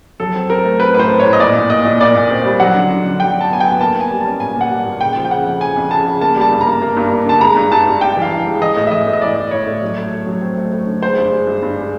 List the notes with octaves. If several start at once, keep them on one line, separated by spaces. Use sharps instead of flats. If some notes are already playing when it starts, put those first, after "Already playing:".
F#3 A4
C4
C4 A#4
A3
C4 B4
A2 B4
C5
C4
C#5
A2
D#5
A#2 D5
A#2
A#2 D#5
A#2
A#2 D5
A#2
C4
G3
F#3 F#5
D3
D3
D3
F#3 G5
F#3
A5
B3 G#5
B3 G5
A#3 A5
A#3
G#5
G3
C#4 A5
A#2 G#5
A#3 F#5
G3
A#2
C#3 G5
F3
G5
C#3 F#5
F2
C#3 G#5
F2
C#3 A5
C#3
A#3 A5
G3 A5
G2
A#3 A#5
A#3
G2
A#3
D3 A5
G#3 A#5
G2
G2 A5
G2
G2 G5
E3 F5
E3
G#3
E3 D#5
A2
E5
E3 D#5
A2
D#5
E3 D5
A2
A2 C#5
A2
F#3
A3
A3
F#3
C4
A3
A3
D3
G#3 C5
G2
G#3
G2
G2
G#3